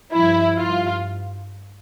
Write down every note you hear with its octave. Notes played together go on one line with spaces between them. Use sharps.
G2 F3 E4
G2 F4